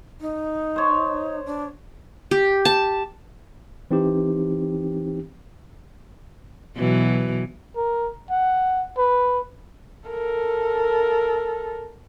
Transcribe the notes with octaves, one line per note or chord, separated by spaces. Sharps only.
D#4
C5 C#5
D4
G4
A5
E3 C4 D#4 G4
B2 E3 F#3
A#4
F#5
B4
A4 A#4